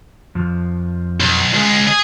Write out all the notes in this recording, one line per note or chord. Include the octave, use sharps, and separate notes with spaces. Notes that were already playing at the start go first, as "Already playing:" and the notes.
F2 F3
B1
C#2 G#3
G#4